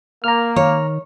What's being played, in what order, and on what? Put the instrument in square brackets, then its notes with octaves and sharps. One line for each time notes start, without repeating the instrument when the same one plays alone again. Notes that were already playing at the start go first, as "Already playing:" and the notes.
[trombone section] A#3 [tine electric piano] A#5 F6
[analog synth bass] D#3 [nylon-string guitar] C#5